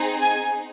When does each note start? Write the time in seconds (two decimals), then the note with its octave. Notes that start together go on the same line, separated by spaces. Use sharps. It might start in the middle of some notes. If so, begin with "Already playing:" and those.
Already playing: C4 D#4 G#4
0.21 G#5